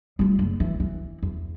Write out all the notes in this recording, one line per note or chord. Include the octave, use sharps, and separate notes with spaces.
G3 F4
F#1
E3
E3
E2